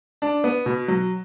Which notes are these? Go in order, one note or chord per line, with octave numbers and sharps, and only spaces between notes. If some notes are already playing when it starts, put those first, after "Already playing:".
D4
B3
B2
F#3